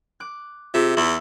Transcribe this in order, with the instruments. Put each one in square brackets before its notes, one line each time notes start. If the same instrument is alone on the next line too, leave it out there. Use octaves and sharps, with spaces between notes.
[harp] D6 F#6
[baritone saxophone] C3 [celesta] F4 G#4 [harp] E5
[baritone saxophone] E2 [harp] E5 [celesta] F#7